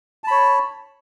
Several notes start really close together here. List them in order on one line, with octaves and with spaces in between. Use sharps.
A5 B5 C#5